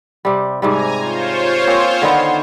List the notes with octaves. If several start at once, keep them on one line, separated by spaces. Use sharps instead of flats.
C3 G3
G#2 C3 G3 G#5 A#5
F4 C5 C#5
A#3 C4 C#4
D3 D#3 B3